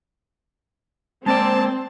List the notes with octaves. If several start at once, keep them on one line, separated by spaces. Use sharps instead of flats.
G#3 A#3 C4 D5 A5